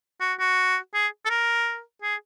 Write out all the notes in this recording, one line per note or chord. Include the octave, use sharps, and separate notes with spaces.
F#4
F#4
G#4
A4
A#4
G#4